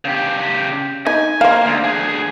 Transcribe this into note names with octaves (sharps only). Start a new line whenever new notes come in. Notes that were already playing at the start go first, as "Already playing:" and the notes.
C#3 G4
D#4 G#5
A#3 C5 F5
D2
D2 G#4